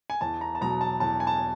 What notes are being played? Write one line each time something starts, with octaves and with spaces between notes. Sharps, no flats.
G#5
E2 A5
A#5
A5
B2 F#3 A#5
A5
E2 A5
G#5
A5